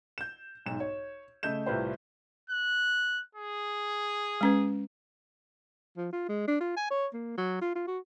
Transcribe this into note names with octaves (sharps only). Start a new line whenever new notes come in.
G6 E7
B1 G#2 E7
C#5
C#3 A3 D#5 G6 E7
C2 A2 F4 G4 B4 C5
F#6
G#4
G#3 C#4 B4
F3
F4
G#3
D4
F4
G#5
C#5
A#3
F#3
F4
F4
F#4